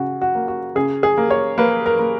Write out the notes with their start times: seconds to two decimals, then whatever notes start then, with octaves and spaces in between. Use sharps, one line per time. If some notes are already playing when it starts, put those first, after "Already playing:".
Already playing: C#3 F#4
0.21 F#4
0.35 A#3
0.48 F#4
0.75 C#3 G#4
1.03 G#4
1.18 A#3
1.31 C#5
1.58 A#3 B4
1.86 A#4
1.99 A#3